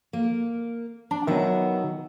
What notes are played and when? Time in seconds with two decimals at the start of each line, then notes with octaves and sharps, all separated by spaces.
0.13 A#3
1.11 D4 A5
1.27 D#3 F#3 B3 E5